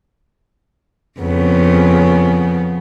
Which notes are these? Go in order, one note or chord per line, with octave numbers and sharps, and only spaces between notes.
F2 C#3 B3